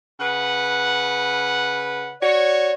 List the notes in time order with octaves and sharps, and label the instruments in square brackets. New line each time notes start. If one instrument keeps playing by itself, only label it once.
[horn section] C#3 B4 F#5
[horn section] F#4 C#5 [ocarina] D5